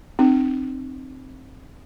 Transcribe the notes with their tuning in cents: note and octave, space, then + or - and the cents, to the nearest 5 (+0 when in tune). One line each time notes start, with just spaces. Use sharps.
C4 +0 D#4 -40